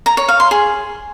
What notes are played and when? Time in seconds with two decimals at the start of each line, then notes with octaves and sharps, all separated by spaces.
0.06 A#5
0.17 C#5
0.28 F5
0.40 C6
0.51 G#4